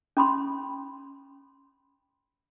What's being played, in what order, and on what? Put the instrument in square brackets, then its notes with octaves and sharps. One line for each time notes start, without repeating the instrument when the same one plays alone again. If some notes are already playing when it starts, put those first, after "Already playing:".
[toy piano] C#4 B5 C6